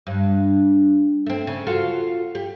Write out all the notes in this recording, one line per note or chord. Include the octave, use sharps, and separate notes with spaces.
G2
A3 C4
C#3
F4 F#4 A4
G4